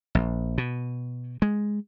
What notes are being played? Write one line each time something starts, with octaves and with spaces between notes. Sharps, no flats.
A#1
B2
G#3